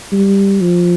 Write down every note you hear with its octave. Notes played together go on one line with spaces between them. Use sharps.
G3
F3